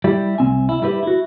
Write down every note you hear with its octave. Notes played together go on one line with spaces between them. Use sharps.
G3 E4 G4
C2 C4 G#5
E4
G3 E4 G4 B4
E4 F#4